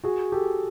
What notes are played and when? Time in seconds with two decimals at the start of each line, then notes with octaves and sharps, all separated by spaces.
0.04 F#4 G#4
0.32 G4 A4